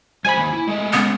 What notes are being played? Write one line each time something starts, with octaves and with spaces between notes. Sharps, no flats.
F3 G#3 C5 G#5 B5
D#3 A#3 D#4
E4
G#3 A3 D#5
C#3 G#3 B3